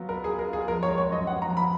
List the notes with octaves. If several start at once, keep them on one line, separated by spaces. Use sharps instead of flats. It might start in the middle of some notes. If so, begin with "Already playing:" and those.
Already playing: F#3 B3 F4
A#4 B4
G#4
B3
A#4
F4 G#4
F3 A#4
C#5
G#3
C#5
F#2 D#5
B3 F#5
A#5
F3
B5